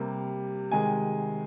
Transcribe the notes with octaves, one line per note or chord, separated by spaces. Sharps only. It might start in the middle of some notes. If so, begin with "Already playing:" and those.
Already playing: C3 G3 A#3
C3 D#3 G#3 G#5